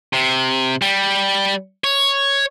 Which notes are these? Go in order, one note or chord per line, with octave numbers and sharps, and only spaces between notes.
C3
G3
C#5